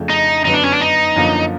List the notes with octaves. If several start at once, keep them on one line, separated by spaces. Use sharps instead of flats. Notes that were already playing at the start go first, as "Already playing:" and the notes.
Already playing: F2 C#3 F3 A3 D4
D#4
F#2 D3 F#3 B3 D#4
D4
C#4
D4
D#4
F#2 D3 F3 A#3